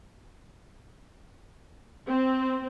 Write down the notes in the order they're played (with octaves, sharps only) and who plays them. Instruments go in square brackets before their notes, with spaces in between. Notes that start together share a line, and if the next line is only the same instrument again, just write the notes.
[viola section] C4